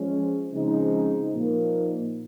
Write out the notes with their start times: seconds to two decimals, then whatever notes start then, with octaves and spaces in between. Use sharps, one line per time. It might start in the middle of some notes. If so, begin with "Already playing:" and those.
Already playing: F3 G#3 C#4
0.51 C#3 F3 G#3 C4 D#4
1.31 A#2 F3 A#3 D#4